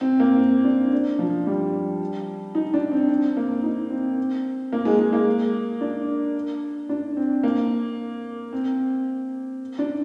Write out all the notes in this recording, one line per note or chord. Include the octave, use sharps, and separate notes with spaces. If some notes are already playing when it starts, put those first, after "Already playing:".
C4
A#3
C4
D4
D4
F3
G3
D#4
D4
C4
C4
A#3
D#4
C4
A#3
G#3
G#3
A#3
D4
D4
C4
A#3
C4
D4